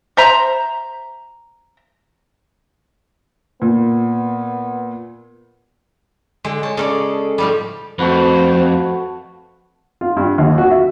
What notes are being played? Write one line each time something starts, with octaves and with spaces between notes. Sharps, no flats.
C5 E5 A#5
A#2 B3
D3 G#3
C#5 A5
C#3 G#4 A4 D5
A2 F3 G3
F2 A3 F#4 B4 C5
F4
G2
D#2
F#4
E5